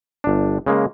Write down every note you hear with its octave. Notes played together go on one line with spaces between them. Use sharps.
G1 D4
C#3 G#3 A#3